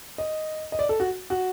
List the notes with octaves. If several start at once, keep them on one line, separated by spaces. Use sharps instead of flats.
D#5
D#5
D5
A4
F#4
F#4